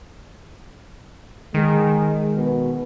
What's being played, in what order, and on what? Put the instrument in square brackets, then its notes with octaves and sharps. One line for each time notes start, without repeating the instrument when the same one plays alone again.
[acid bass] D#3 [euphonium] G#3
[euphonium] B2